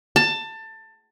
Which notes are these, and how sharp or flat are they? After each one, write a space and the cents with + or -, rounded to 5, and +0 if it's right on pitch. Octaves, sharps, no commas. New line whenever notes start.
A5 +20